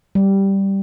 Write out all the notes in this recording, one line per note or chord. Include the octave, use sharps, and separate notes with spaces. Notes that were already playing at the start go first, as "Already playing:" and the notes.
G3